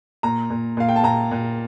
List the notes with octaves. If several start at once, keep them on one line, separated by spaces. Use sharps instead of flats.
A#2 A#5
A#2
A#2 F5
G5
A5
A#2 A#5
A#2